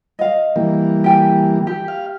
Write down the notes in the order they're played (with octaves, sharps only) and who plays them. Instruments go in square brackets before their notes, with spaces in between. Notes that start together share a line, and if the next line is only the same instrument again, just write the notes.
[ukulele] D#5 F5
[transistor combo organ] E3 G3 A#3
[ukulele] G4 G5 G#5
G4
[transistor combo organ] F5